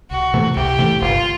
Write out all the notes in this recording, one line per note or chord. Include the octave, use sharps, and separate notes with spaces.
C2 F#4
C3 E3 A3
C2 G4
C3 E3 A3
G1 F4